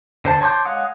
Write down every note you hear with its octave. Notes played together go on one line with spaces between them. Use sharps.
D3 C5 A5
C#5 A5 C6 D6 G6
G#3 C#5 F5 F#5 D#6